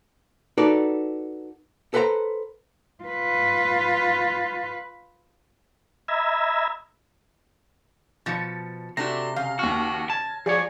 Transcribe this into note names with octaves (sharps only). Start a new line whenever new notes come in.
D#4 F#4 A4 B4 D5
A4 B4 C5 F#5 A#5
F4 B4
D#5 E5 A#5 B5 E6 G#6
B2 F3 A6 C#7
C3 A3 D4 F#4 A#6
C#3 F5
D#2 F#4 F6
A5 G#6
F3 G#4 C#5 D5